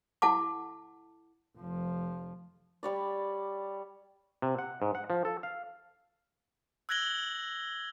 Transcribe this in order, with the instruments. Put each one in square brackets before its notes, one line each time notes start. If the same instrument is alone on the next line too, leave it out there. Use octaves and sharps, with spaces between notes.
[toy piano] E4 A4 F#5 A5 D6
[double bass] F1 F3
[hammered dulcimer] G3 C#5 D5
[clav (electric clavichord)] C3
F#5
G#2
F#5
F3
A4
F5
[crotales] E6 F#6 G#6 A#6 F#7 G7